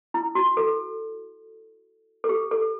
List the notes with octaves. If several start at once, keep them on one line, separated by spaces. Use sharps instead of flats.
E4
F#4
A4
A4
G4
A4